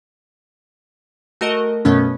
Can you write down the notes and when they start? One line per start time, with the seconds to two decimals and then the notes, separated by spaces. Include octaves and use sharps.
1.41 A3 F#4 A#4 D#5
1.85 F#2 B2 A3 B3 C#4